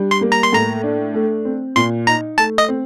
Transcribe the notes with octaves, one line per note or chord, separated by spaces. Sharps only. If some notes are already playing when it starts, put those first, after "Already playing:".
Already playing: G3 D4
C6
A#3
A#5
C6
A2 A#5
D4
A3
C4
A#2 C6
D#4 A#5
A3 A5
D#5
C4